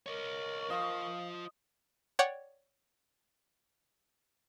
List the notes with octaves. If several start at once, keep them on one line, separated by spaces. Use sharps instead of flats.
A#4 C#5 D#5 C#6
F4 C5 D#5 F5
C#5 D5 F#5 G5